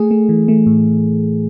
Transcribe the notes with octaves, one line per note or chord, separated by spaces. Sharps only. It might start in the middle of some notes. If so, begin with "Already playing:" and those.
Already playing: A3 G#4
A3
E3
A3
A2